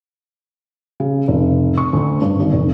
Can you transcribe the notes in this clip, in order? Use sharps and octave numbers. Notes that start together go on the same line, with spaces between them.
C#3
F1
C#6
D2
G2
G#1
F1